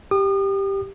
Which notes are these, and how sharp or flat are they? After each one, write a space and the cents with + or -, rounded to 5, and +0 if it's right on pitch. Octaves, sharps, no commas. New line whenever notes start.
G4 +0 D#6 -40